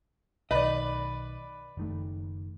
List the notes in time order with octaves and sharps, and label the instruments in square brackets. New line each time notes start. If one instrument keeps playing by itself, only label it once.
[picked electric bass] B1 D#3 [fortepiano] B4 D5 [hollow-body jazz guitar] D#5
[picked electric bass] F#1 D#3 A3